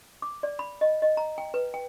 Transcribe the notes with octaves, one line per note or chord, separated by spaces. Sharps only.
D6
D5
B5
D#5
D#5
A#5
G5
B4
G5